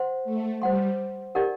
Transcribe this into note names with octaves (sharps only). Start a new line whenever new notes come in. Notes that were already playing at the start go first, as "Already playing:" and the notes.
Already playing: C5 F#5 C6
A3
G3 C5 F#5 C6
D#4 G4 A#4 D5 F#5